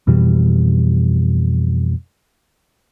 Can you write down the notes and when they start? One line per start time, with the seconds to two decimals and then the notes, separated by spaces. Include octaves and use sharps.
0.07 F2 B2 E3 G3